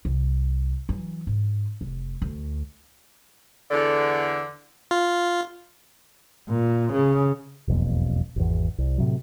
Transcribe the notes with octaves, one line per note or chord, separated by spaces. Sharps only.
C2
E3 F#3
G#2
F1
D2
E2 D3
F4
A#2
C#3
E1 B1 F2 A#3
G#1 E2
C2
A2 C3 F#3